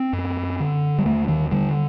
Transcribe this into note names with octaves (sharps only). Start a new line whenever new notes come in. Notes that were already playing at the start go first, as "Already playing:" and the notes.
Already playing: C4
F#2
D3
G3
D#2 A3
D#3
D3 G3